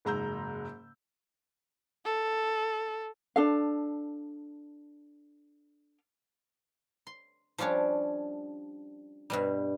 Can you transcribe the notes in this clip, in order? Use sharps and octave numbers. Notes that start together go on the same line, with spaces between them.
F#1 G#2 G#3 A#5 E6 G6
A4
D4 A4 F5
C6
F3 G3 C#4 D4 C#5
G2 B2 G3